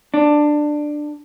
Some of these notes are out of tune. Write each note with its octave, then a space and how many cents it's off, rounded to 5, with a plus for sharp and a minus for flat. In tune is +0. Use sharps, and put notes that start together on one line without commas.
D4 +15